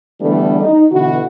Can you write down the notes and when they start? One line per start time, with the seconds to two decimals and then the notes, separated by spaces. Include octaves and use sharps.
0.21 D3 E3 G3 A3 B3 D4
0.60 D#4
0.91 B2 D3 E3 E4 F#4